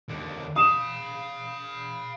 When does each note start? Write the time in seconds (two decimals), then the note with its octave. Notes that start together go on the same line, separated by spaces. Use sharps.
0.08 D#2 D3
0.56 F5 B5 D#6 E7